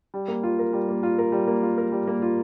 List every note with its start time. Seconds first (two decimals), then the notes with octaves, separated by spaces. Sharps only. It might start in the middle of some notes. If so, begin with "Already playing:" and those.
0.14 G3
0.28 A#3
0.43 F4
0.59 A#4
0.73 G3
0.88 A#3
1.03 F4
1.19 A#4
1.32 G3
1.47 A#3
1.63 F4
1.78 A#4
1.92 G3
2.07 A#3
2.22 F4